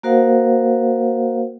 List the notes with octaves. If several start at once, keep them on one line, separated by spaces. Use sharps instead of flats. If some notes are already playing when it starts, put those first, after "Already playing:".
A#3 F#4 A#4 C5 F5 F#5